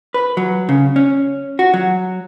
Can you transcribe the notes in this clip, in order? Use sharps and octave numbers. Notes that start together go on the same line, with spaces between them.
B4
F#3
C#3
C#4
F#4
F#3